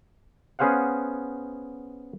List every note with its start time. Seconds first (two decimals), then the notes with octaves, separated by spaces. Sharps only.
0.59 B3 C#4 G#4 C5 F5 F#5